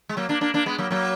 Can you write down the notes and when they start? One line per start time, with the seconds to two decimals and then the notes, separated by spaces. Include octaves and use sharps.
0.09 G#3
0.17 F#3 A#3
0.29 A#3 D4
0.41 A#3 D4
0.54 A#3 D4
0.66 G#3 B3
0.78 F#3 A#3
0.91 F#3 A#3